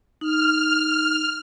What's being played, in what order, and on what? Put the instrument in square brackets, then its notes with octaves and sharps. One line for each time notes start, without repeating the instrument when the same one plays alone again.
[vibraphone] D#4 [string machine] F6